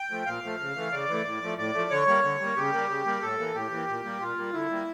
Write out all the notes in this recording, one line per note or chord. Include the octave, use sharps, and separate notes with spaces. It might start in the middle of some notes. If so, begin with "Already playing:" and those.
Already playing: G5
F3 A3
A#2 F5
F3 A3
C#3
E3 A3
C#3 D5
E3 A3
A2
F3 A3
A2 D5
F3 A3
D3 C#5
G3 A#3
D3
G3 A#3
C#3 G4
G3 A#3
C#3
G3 A#3
A2 A4
E3 A#3
A2 G4
E3 A#3
A#2
G3 A#3
A#2 F4
G3 A#3
D3 E4
G3 A#3